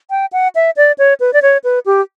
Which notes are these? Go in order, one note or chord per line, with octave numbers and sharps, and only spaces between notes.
G5
F#5
E5
D5
C#5
B4
D5
C#5
B4
G4